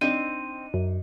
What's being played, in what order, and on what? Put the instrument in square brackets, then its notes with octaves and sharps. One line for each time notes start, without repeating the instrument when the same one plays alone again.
[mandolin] C4 [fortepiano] D4 D#4 [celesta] D#7
[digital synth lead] F#2